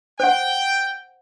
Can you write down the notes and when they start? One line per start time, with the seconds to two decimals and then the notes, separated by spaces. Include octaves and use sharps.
0.20 C5 F#5 G5